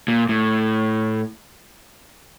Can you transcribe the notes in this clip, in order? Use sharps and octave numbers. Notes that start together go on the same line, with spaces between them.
A#2
A2